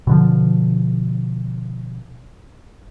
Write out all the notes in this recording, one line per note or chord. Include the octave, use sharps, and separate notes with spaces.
B2 D3 F3